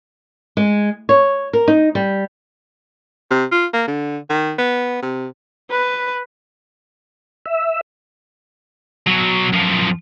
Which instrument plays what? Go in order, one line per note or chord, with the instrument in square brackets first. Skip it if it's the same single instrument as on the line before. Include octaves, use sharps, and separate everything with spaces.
[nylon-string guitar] G#3
C#5
A#4
D#4
G3
[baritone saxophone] C3
F4
A#3
D3
D#3
B3
C3
[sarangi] B4
[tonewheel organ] E5
[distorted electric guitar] B1 F#3
F#2 F3